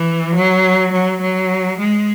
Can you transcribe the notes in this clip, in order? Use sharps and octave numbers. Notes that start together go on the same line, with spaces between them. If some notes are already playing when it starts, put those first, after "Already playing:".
Already playing: E3
F#3
F#3
F#3
G#3